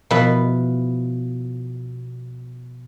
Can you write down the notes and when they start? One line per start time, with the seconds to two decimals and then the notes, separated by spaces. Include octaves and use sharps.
0.11 B2 F3 E4 B4